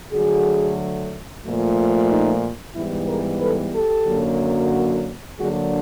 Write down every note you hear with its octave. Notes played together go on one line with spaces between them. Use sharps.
D3 F#3 A3 F#4 G#4
A#2 F3 A3
D#4
G#2 E3 G3 B3 E4
G#4 A#4
A4 B4
G4 A4
F#2 D3 F#3 A#3
D3 F#3 A#3 D4 F#4 G#4